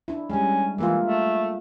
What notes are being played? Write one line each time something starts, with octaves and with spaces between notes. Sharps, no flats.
D4 E4
G3 G#3 C#4
E3 G#3 A#3 F4
A3